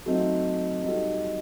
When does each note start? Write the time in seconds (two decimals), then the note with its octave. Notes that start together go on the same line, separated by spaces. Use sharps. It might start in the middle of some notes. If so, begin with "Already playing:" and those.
0.06 F#3 A3 C4 D#4 F#4
0.83 G3 D#4 F#4 A4